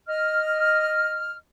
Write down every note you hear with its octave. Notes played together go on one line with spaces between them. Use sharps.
D#5 F6